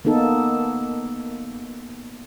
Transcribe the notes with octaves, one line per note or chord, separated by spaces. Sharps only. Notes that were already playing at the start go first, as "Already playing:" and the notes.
A#3 B3 D#4 A4